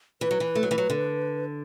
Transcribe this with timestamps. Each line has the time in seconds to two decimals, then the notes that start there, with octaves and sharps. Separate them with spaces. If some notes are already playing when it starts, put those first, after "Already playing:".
0.21 E3 B4
0.31 F#3
0.40 E3
0.55 A3
0.63 F#3
0.71 E3
0.78 F#3
0.90 D3